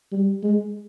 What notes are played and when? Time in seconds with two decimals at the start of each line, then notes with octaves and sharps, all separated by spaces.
0.12 G3
0.43 G#3